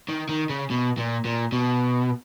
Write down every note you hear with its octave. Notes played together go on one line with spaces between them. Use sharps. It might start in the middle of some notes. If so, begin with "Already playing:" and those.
D#3
D#3
C#3
B2
A#2
A#2
B2